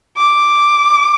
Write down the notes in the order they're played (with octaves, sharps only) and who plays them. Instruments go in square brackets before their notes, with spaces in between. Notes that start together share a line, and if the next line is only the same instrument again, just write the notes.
[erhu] D6